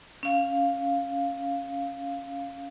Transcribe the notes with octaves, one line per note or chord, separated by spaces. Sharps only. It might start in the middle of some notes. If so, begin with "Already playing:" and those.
C#4 F5